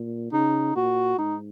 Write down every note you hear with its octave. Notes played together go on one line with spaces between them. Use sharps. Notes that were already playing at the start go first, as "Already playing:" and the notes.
Already playing: A#2
C#3 D#4
A#2 F#4
G#2 D#4